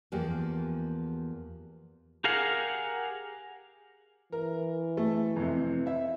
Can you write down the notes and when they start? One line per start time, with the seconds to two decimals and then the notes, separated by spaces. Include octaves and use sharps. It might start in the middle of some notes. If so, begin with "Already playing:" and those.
0.12 E2 F3 A#3 G4
2.24 G4 G#4 A#4 F5 F#5
4.32 E3 A#4
4.97 A3
5.36 F2 C3
5.86 E4 E5